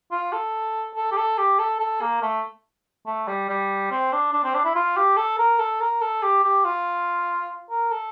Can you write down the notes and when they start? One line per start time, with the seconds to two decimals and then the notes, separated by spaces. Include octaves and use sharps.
0.12 F4
0.33 A4
0.96 A4
1.12 G4
1.17 A4
1.39 G4
1.59 A4
1.80 A4
2.01 A#3
2.23 A3
3.07 A3
3.28 G3
3.49 G3
3.91 C4
4.12 D4
4.33 D4
4.44 C4
4.54 D4
4.65 E4
4.76 F4
4.97 G4
5.17 A4
5.39 A#4
5.59 A4
5.81 A#4
6.01 A4
6.23 G4
6.44 G4
6.65 F4
7.70 A#4
7.92 A4